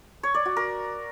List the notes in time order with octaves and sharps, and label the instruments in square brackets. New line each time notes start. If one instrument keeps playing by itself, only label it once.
[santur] C#5
D5
F#4
A#4